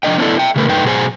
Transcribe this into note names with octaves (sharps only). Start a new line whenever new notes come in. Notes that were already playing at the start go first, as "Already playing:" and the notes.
F3 D4 D#5 G5
B3 C#4 D4 E4 A4
E5 G5
C#3 E3 A3 A#4 B4
F#2 A3 D#4 B4 G5
B2 F#3 G#4 C5 G#5